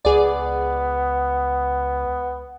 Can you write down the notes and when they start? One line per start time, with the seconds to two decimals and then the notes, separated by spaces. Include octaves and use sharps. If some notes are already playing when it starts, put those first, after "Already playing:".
0.05 C#2 B3 G#4 D5